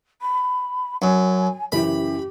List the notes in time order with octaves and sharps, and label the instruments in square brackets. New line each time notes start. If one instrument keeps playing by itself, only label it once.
[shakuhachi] B5
[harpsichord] F#2 [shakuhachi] G#5
[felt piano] F#2 C#3 E3 [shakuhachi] G4 [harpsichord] B5